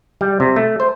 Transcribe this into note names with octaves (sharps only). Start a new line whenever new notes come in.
G3
C3
A3
C5